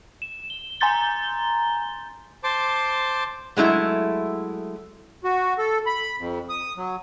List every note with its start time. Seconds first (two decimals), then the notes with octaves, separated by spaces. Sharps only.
0.22 E7
0.50 G7
0.80 G#5 A#5 C6 G6 A6 G7
2.44 C5 A5 C6 D6
3.57 F#3 G#3 A3 E4
5.24 F#4
5.58 A4
5.86 B5
6.19 F2
6.49 D#6
6.77 F#3